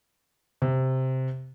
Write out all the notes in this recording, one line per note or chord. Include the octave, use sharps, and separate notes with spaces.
C3